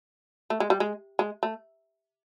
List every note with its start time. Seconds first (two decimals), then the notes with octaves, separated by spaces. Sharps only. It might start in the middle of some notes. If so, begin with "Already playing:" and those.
0.50 A3
0.60 G#3
0.70 G3
0.80 G#3
1.19 G#3
1.43 A3